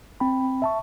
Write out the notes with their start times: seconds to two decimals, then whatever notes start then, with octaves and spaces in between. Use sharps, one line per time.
0.20 C4 G5 B5
0.62 E5 A5 C#6